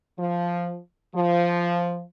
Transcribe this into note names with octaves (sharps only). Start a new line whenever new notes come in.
F3
F3